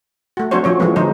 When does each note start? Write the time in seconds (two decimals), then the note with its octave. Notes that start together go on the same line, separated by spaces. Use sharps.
0.37 A3 F#4
0.51 F#3 C4 D4 F#4 C5 C#5
0.64 F3 C#4 C#5
0.80 E3 F3 G#3 A3 B3
0.96 D3 F3 G#3 D#4 C5